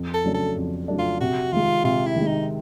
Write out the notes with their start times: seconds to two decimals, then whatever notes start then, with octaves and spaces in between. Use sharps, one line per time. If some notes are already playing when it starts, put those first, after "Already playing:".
Already playing: F2
0.14 A4
0.24 C#3 F#3 A3 D4
0.34 A4
0.56 F2
0.88 C#3 F#3 A3 D4
0.99 F4
1.21 C3 F#4
1.53 D#3 G#3 F4
1.84 C3 F4
2.06 E4
2.16 D#3
2.21 G#3
2.27 D#4